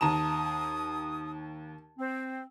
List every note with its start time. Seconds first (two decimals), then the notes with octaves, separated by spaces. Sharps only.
0.01 D#2 A5 A#5 D#6 E7
1.99 C4